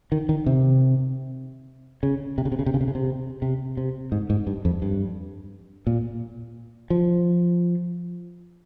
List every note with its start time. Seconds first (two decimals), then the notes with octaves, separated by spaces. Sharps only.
0.12 D#3
0.29 D#3
0.46 C3
2.03 C#3
2.38 C3
2.45 C#3
2.52 C3
2.59 C#3
2.66 C3
2.74 C#3
2.81 C3
2.88 C#3
2.95 C3
3.42 C3
3.77 C3
4.12 G#2
4.30 G#2
4.47 G2
4.65 F2
4.82 G2
5.87 A#2
6.90 F3